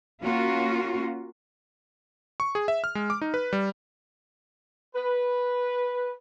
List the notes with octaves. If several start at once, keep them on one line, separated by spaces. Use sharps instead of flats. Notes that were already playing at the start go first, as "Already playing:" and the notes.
A#3 C#4 F4 F#4
C#6
G#4
E5
F6
G#3
D6
D#4
B4
G3
B4